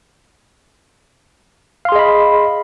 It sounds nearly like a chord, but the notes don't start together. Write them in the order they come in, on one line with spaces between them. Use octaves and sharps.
F5 C6 G#4 D#5 B5